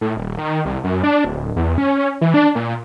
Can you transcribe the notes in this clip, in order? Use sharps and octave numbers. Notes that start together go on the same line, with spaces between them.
A2
D#1
D#3
C2
F#2
D4
D1
E2
C#4
E3
D4
A#2